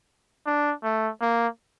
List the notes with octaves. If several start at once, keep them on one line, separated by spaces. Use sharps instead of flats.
D4
A3
A#3